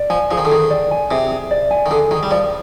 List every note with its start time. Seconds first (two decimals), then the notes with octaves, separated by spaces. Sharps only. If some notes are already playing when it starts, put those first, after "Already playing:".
Already playing: D5
0.10 F3 G#5
0.31 F3 G#4
0.38 D#3
0.45 D3
0.51 D#3 G#4
0.70 D5
0.91 G#5
1.11 C3 G#4
1.31 G#4
1.51 D5
1.71 G#5
1.86 D#3
1.91 D3 G#4
2.11 D#3 G#4
2.23 G3
2.31 F3 D5